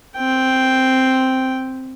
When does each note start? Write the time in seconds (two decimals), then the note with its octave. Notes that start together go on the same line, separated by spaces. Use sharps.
0.17 C4 G5